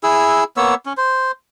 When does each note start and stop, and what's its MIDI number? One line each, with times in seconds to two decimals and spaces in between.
0.03 0.44 64
0.03 0.44 68
0.03 0.44 88
0.57 0.75 58
0.57 0.75 59
0.57 0.75 73
0.57 0.75 88
0.86 0.93 61
0.97 1.32 72